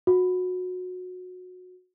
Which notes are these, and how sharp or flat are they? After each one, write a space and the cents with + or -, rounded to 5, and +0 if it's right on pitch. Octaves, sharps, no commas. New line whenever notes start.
F#4 -20